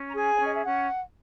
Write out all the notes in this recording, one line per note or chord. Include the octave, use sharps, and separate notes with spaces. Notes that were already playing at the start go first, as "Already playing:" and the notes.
Already playing: C#4
A#5
G#4 G#5
C#5
C#4
D#5
E5
C#4 F#5